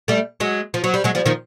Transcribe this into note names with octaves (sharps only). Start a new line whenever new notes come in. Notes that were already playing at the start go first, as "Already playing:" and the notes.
G3 A3
F#3 G#3
F3
F#3
G3
F#3 G#3
F3 G3
D#3 F3